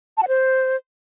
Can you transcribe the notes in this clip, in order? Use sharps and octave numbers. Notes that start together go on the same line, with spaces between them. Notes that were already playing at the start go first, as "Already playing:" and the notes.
A5
F#5
C5